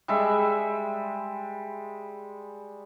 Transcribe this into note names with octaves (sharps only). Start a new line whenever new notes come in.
G3 G#3 E5